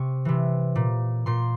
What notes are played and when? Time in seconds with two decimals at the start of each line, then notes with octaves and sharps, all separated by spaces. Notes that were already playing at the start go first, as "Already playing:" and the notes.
Already playing: C3 C#6
0.25 C3 E3
0.75 A#2
1.26 A#2 C6